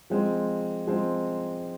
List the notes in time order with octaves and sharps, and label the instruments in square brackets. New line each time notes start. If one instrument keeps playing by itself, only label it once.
[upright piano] F3 G#3 C4
F3 G#3 C4